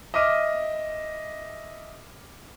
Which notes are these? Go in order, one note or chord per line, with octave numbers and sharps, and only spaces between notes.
D#5 E5 D6 F6 D#7